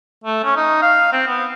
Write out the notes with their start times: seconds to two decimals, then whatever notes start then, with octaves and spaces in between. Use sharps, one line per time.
0.24 A3
0.43 C#4
0.56 D#4
0.82 F5
1.12 C4
1.27 B3